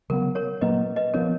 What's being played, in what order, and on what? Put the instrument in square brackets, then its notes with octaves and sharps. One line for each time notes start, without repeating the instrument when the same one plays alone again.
[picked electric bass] C#3 F#3 B3 [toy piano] A#4
[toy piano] A#4 C#5
[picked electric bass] A#2 F#3 A#3 [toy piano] B4 D#5
[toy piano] B4 D#5
[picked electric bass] F3 B3 [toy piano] A#4 C#5